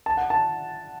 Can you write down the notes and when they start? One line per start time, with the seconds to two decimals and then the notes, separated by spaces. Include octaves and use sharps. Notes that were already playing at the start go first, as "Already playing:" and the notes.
0.06 A5
0.17 F#5
0.30 A5